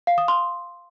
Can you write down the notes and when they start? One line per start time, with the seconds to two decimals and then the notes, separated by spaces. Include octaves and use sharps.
0.07 F5
0.18 D#6
0.28 C6